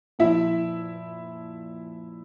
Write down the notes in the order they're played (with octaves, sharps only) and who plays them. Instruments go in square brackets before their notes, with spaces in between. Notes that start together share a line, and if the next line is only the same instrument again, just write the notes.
[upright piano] A#2 F3 E4 E5